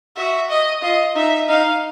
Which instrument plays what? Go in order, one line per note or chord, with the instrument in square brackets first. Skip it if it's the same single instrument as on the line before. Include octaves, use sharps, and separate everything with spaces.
[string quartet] F#4 [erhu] E5
[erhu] D#5
[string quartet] F4 [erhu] D#5
[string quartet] D#4 [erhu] E5
[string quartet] D#4 [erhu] F5